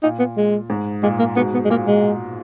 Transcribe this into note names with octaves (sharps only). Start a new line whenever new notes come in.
A#2 D#4
B3
G#3
G#2
A#2 G#3
A#3
G#2 B2 B3
B3
G#3
A#2 A#3
G#3